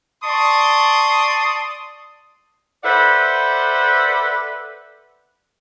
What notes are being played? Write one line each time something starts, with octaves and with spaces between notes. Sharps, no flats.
D5 A5 C6 C#6 D#6
A4 B4 C5 D5 E5 F#5